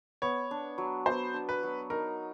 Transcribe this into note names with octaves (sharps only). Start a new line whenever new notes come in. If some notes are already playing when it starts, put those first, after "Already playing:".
B3 C#5
D4
F#3
B3 C5
D4
B4
F#3
D#4 A#4